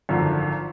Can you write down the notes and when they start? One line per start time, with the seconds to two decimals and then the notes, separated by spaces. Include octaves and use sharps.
0.09 G#1 F#2 D3 F3